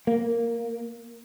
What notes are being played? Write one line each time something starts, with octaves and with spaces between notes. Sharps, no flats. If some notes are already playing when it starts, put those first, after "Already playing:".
A#3